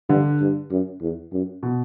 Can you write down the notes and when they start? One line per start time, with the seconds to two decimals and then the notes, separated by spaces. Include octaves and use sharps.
0.09 G2 D3
0.41 G2
0.71 F#2
1.02 E2
1.33 F#2
1.63 B2